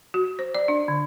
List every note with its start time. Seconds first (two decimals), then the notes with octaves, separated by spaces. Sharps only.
0.14 F#4
0.39 C5
0.55 D5
0.68 D4
0.88 D3